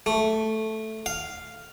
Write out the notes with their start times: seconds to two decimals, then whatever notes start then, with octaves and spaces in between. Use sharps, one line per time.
0.06 A3
1.06 F5